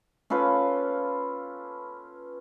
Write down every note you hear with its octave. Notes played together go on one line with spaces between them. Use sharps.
C#4 F4 A4 B4